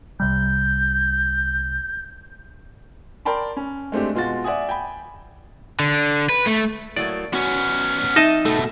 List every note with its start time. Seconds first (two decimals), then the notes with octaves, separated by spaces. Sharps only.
0.20 C2 C3 G3 G6
3.25 A#4 D5 G5 A5 B5 C6
3.57 C#4
3.92 G#3 A3 C4 D4 G4
4.15 B2 G#3 F4 F#4 A6
4.44 D5 E5 F#5 G#5 D#6
4.69 G5 G#5 B5
5.80 D3
6.29 B4
6.46 A3
6.96 A2 F#3 A#3 D5
7.33 B3 C#4 F#4
8.16 F2 D#4 D#5 E5 A5
8.45 B2 A3 A4